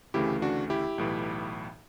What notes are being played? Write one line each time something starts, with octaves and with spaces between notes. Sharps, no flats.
D2 C#3 E3 A3 E4 G4
D4 F#4
E4 G4
B1 A2 E3